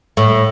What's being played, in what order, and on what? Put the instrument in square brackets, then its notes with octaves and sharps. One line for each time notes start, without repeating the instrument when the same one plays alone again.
[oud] A2